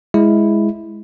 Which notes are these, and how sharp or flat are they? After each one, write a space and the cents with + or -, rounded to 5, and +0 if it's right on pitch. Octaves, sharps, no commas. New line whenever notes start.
G#3 +0 E4 +0